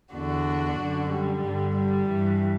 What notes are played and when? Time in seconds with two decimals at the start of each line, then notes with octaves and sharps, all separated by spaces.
0.14 E2 D3 D4 F#4
0.79 F#2 D3
1.11 G3
1.44 G2 D3
1.77 G3
2.09 G2 E3